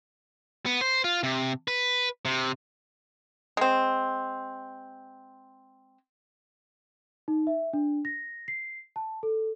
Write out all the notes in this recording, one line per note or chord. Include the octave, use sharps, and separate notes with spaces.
B3
C5
F4
C3
B4
C3
G#3 C4
D#4
E5
D4
A#6
C7
A5
A4